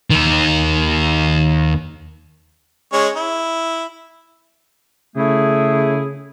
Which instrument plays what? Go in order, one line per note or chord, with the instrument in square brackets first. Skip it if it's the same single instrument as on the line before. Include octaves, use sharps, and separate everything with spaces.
[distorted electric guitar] D#2 D#3
[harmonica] G#3 C#4 C#5
E4
[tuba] C#3 [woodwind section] A3 E4 G#4